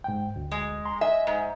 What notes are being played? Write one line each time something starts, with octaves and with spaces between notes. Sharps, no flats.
G#2 G5
D2
G#3
A#5 C6
D#5 E5 G#5
G#2